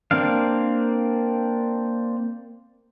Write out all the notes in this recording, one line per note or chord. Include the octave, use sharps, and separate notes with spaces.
A#3 C4 D4 F5